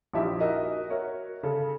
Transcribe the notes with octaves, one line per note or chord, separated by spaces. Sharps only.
A#1 F3 D#4 E4 G4 E5
D#4 F#4 G#4 A#4 D#5 E5
F#4 A#4 C#5 E5
C#3 A4